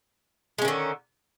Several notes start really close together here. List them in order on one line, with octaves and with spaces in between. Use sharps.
G#3 C#4 D#3 D3